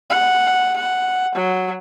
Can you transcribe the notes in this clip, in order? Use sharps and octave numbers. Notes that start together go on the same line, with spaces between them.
F#5
F#5
F#3